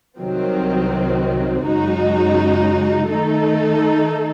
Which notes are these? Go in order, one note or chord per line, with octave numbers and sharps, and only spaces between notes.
C2 C3 D#3 F#3 C4
F#2 C#3 G#3 D#4 F#4
D#3 A3 D#4 A4